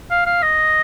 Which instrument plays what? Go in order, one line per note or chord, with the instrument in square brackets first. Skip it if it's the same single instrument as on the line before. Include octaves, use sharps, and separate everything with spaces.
[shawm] F5
F5
D#5